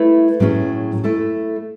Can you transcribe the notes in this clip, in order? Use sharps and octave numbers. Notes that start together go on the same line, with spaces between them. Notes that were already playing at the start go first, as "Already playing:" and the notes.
Already playing: A3 E4 B4
A2 F#3 C#4 G#4
A3 E4 A4